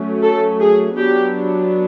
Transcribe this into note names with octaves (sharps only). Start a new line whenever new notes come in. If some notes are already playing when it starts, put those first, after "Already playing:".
Already playing: F#3 A3 C#4
A4
G#4
F#3 B3 D4 G4